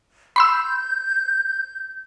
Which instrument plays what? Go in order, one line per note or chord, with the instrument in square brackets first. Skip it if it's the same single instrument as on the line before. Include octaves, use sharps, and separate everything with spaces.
[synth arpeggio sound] B5 C6 E6 [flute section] G6